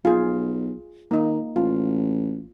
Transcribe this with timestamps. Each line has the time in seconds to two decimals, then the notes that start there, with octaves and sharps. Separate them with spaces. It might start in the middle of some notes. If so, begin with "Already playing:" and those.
0.05 B1 F4 G#4
1.11 D#3 A#3 D#4
1.56 A1 F4